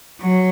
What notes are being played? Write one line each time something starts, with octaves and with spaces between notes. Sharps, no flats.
F#3